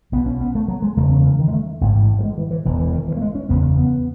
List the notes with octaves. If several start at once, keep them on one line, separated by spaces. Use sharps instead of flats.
B1 B2 B3
C#4
B3
A3
F#3
G#3
E1 E2 C#3 A3
C#4
E3
D#3
G#3
A3
A1 G#2
F#3
G#3
E3
E3
E1 E2 B2 F#3
E3
D#3
E3
A3
G#3
C#4
F#1 E2 C#3 B3
C#4
B3